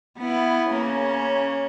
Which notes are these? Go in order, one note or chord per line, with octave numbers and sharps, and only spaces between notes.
B3 E4
C#3 A#3 C#4